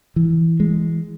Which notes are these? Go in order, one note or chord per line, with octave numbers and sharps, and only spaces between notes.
E3
G#3